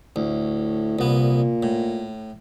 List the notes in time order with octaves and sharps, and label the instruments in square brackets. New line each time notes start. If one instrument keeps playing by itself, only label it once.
[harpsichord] D2 [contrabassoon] A2
[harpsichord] C2 B3 [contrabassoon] A#2
[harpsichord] A2